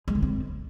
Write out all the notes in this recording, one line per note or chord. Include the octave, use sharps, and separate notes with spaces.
G#3
D3
C4